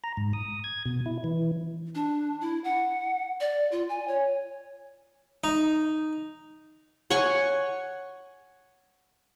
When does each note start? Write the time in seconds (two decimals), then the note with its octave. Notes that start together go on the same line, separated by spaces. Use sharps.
0.04 A#5
0.17 G#2
0.33 D#6
0.64 G#6
0.86 B2
1.06 E4
1.24 E3
1.95 D4
2.41 E4
2.64 F#5
3.40 D5
3.72 F4
3.89 G#5
4.08 C#5
5.44 D#4
7.10 C#5 F#5 G#5 C#6